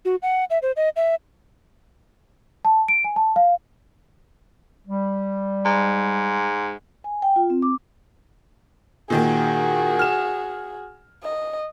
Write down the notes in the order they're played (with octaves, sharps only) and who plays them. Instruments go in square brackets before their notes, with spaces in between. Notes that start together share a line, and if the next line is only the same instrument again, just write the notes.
[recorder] F#4
F#5
E5
C5
D#5
E5
[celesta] A5
D7
G#5
A5
F5
[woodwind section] G3
[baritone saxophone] G#2
[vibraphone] G#5
G5
F4
C4
D6
[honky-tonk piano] A#2 D#3 A#3 [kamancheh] F#4 G#4
[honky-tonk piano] F6 E7
[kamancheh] D#5